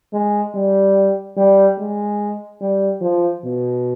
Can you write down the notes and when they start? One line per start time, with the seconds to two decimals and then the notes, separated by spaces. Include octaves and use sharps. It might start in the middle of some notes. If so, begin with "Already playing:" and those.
0.14 G#3
0.55 G3
1.37 G3
1.78 G#3
2.61 G3
3.01 F3
3.44 B2